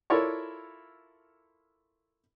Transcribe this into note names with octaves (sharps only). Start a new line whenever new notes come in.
E4 F4 A4 A#4 C#5 D5